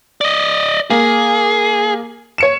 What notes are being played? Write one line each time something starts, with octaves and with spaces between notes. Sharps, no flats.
D5 D#5
A#3 G#4
C#5 C#7 E7